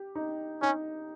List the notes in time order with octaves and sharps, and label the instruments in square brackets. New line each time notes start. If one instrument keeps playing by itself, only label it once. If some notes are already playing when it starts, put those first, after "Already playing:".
Already playing: [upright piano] G4
D#4
[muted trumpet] C#4 [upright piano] D#4